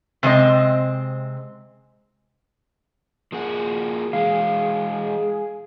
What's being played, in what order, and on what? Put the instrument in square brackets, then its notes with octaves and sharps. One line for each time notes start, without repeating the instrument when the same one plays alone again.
[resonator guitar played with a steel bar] C3 G#3 C4 D#5
[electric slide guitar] F3 A#3 F#4 [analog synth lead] G#4
[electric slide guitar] E3 G#3 [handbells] F5